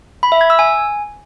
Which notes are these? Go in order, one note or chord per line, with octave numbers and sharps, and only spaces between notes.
B5
E5
G#6
E6
G#5